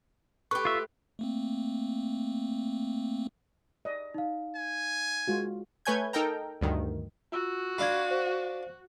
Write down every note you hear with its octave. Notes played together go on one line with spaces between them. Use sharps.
A3 G4 B4 C#6
F4 E5
A3 A#3 C4
D5 D#5
D#4 F5
G#5
G#3 F4 F#4
A3 B4 C#5 G#5 G6 G#6
D#4 A4 A#4 G5 A#5
D2 G2 D#3
F4 F#4 E6
D4 F4 B5 G#6
C5